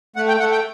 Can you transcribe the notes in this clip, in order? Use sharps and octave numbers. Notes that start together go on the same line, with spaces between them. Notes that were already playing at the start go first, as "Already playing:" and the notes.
A3 F#5
G5
A3 F#5
G5